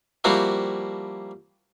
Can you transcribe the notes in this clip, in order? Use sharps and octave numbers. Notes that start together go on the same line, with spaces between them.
F3 G3 A#3 C4 E4 F#4